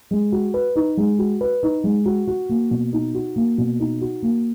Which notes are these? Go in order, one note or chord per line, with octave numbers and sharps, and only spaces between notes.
G#3
F#4
B4
D#4
G#3
F#4
B4
D#4
G#3
F#4
F#4
A#3
B2
D#4
F#4
A#3
B2
D#4
F#4
A#3